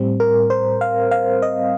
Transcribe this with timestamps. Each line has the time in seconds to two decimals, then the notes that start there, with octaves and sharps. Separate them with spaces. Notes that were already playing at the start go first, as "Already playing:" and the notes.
Already playing: A2 G3 C4
0.20 A#4
0.50 C5
0.81 F5
1.11 F5
1.42 D#5